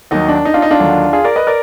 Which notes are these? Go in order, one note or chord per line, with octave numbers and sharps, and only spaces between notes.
D#2 D#3 F#3 D#4
D4
D#4
D4 F4
D#4
D4 F4
D#2 D3 F#3
F4 G#4
A#4 D5
B4 D#5
A#4 D5